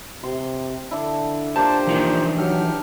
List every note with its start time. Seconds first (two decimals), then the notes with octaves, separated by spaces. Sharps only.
0.23 C3 C6
0.91 D3 D4 E4
1.56 A#3 D4 F4 G4 C5 A5
1.87 A#2 E3 F3 D#4
2.38 F#3 G4 A4 F6